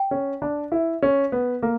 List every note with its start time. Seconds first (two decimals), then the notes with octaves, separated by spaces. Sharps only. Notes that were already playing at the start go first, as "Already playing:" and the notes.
Already playing: G5
0.11 C#4
0.42 D4
0.72 E4
1.02 C#4
1.32 B3
1.62 A#3